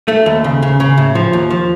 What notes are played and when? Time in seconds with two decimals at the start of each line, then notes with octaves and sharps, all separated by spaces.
0.08 A3
0.26 D#2
0.44 C#3
0.62 C#3
0.80 C#3
0.98 A2
1.15 F3
1.33 D#2
1.50 F3